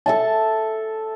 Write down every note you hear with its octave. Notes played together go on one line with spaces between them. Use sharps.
A4 E5 A5